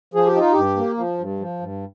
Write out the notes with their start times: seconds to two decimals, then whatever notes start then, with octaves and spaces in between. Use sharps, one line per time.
0.14 F3 G#4
0.26 G4
0.35 D#4 F4
0.53 G2 G4
0.77 A#3
0.97 F3
1.18 G2
1.40 F3
1.60 G2